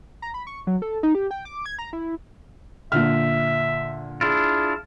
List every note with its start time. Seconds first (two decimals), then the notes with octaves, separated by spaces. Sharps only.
0.22 A#5
0.34 B5
0.47 C#6
0.67 F#3
0.82 A4
1.03 D#4
1.15 G4
1.31 G5
1.45 D6
1.66 G#6
1.79 A#5
1.93 E4
2.92 A#2 D3 E5 F6
4.21 D4 E4 F4 G#4